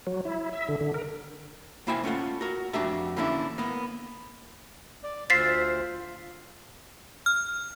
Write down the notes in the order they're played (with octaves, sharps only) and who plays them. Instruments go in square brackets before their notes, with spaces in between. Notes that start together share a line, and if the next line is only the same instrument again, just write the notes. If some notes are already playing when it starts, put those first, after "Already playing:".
[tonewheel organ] F#3
E4
E5
D3
D3
A#4
[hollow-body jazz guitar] C2 A#3 E4 C5 G5 G#5
A3 C#4 F4 F#5
F#4 A#4
F2 D4 F#4 G4 E5 A#5
D3 E3 A#3 C#4 D4 E4
A#3 B3
[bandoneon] D5
[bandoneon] D2 C5 [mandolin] F4 E6 [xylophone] A6 B6 C7
[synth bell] F6